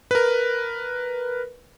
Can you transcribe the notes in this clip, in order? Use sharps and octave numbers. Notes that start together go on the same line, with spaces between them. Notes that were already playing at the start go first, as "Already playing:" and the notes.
A#4 B4